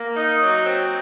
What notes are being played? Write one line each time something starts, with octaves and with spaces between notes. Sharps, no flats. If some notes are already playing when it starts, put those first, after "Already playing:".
Already playing: A#3
D#4
F#3
C4